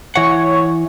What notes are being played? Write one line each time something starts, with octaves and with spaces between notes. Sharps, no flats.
E3 C#5 F#5